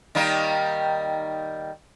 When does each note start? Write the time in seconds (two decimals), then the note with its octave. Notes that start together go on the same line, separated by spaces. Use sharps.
0.15 D#3 G3 A#3